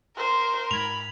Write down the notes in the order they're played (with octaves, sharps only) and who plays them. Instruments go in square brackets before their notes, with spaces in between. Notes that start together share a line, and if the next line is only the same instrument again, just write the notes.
[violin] A#4 [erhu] C5
[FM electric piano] G#2 G#6 [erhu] B5 [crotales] F7